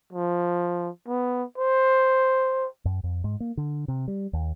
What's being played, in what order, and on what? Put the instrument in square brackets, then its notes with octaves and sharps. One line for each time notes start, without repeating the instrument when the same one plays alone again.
[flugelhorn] F3
B3
C5
[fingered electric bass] F#2
F2
G#2
A#3
D3
C3
G3
D#2